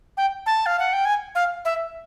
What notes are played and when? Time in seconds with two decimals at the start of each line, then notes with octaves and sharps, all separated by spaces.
0.17 G5
0.46 A5
0.66 F5
0.79 F#5
0.93 G5
1.05 G#5
1.35 F5
1.65 E5